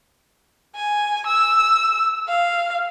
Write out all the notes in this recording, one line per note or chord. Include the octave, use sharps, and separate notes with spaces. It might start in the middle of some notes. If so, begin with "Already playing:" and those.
G#5
E6
F5